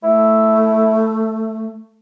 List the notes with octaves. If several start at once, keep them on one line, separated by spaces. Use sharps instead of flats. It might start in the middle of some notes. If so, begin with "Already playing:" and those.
A3 E4